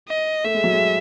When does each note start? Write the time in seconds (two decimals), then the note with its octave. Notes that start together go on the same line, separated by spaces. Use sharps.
0.09 D#5
0.44 A3 E5
0.55 G#3
0.64 F#3
0.73 G#3